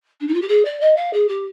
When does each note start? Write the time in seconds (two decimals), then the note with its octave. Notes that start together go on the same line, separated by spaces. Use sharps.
0.20 D4
0.27 D#4
0.34 F4
0.41 G4
0.48 G#4
0.65 D5
0.81 D#5
0.96 F5
1.13 G#4
1.28 G4